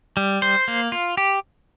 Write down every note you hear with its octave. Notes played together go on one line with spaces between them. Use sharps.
G3
C5
A#3
F4
G4